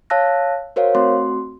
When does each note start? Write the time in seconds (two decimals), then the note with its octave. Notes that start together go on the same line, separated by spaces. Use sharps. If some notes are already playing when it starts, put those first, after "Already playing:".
0.10 C#5 F5 A5 E6 F#6 A#6
0.76 F#4 A#4 C5 C#5 F5
0.95 A3 C4 F#4 C6